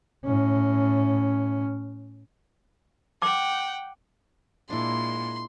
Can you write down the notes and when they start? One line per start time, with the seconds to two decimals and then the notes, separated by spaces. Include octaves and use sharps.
0.25 A2 C#4
3.22 F#5 G5 D6
4.70 A#2 G#3 D4 E4 C6